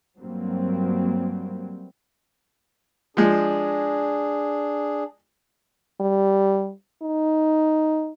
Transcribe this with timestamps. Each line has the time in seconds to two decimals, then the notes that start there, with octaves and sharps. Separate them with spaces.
0.18 G2 F#3 G3 A#3 C4
3.17 F3 G#3 D4 G#4
6.01 G3
7.02 D#4